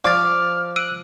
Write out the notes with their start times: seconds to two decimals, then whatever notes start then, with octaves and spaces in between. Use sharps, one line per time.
0.04 F3 D5 F5 D6 F6 A6
0.76 E6 F#6 D7 D#7